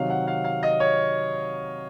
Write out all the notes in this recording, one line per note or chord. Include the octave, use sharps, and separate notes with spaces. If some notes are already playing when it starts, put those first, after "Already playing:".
Already playing: C3 D#3 F#3 F5
F#5
F5
F5
D#5
C#5